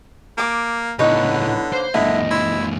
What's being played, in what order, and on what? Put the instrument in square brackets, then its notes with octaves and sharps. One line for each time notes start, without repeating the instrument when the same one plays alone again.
[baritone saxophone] A#3 [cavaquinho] A5 D6
[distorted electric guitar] C#2 A2 [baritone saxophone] D3 [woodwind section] B3 E4 [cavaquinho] D#4 B4 C#5
[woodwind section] A#3 [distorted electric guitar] C5
[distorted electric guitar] F#2 A#2 [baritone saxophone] D3 [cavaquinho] E4 [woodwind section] D#5
[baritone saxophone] E4 [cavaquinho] C6